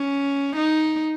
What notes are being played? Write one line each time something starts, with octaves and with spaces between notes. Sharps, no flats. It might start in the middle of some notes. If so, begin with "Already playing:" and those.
Already playing: C#4
D#4